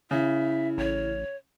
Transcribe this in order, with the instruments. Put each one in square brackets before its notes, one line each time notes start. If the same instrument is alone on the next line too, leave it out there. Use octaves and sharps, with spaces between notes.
[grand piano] C#3 [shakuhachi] E4 [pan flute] E5
[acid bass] A1 [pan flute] C#5